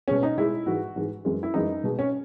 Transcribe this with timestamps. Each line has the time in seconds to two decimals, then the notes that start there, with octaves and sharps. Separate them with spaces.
0.08 B2 G#3 C#4
0.23 D#4
0.38 B2 G#3 E4
0.66 G#2 E3 G#3 F#4
0.96 G#2 E3 G#3
1.25 F#2 E3 G#3
1.43 E4
1.54 F#2 E3 G#3 D#4
1.84 B2 G#3
1.99 C#4